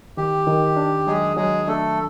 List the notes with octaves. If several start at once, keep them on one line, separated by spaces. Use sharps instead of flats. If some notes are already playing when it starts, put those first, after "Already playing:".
D#3 G4
D#3
D4
F#3 G#3 G#4
F#3 G#3 G#4
A3 D4 A4